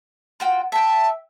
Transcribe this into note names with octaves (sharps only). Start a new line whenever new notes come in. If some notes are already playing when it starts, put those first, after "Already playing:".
F4 F#4 G5
E5 G5 A5